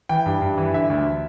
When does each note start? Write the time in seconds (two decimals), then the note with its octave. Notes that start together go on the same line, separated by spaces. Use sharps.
0.09 E3 G5
0.26 G2
0.42 G2
0.58 E3
0.74 D3 E5
0.90 D2